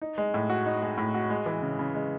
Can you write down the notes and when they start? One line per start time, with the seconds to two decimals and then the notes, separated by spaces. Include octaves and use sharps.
0.02 D#4
0.18 G#3
0.34 A2
0.50 F#4
0.66 D#4
0.82 G#3
0.98 A2
1.14 F#4
1.30 G#3
1.46 E3
1.62 C#3
1.79 C#3
1.95 G#3